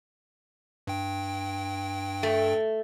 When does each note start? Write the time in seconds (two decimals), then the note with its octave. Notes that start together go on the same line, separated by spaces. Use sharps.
0.87 G2 G5
2.23 A3